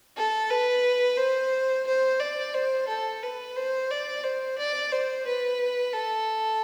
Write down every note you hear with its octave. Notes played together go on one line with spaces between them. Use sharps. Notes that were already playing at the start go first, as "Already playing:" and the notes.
A4
B4
C5
C5
D5
C5
A4
B4
C5
D5
C5
D5
C5
B4
A4